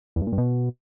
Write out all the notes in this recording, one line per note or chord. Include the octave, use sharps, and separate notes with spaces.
E2
G2
A#2
G2
B2